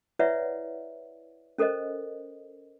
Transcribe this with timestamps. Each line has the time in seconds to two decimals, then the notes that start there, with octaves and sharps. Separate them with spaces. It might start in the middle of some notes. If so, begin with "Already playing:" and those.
0.19 E4 B4 C#5 D5 E5 F#5
1.58 C#4 A4 A#4 C5 D#5